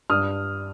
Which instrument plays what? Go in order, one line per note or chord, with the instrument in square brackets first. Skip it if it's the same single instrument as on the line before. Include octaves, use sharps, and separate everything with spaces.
[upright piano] G2 D#6 F6